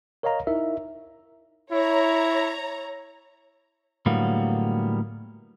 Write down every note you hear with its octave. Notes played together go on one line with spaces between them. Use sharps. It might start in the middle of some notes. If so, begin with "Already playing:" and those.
A#4 C#5 D#5 F5 A#5
D#4 E4 A#4 E5
E4 C#5 A#5
A2 D3 F#3 G3 A#3 B3